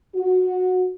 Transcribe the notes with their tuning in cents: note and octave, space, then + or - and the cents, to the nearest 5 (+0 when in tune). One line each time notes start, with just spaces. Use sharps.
F#4 -15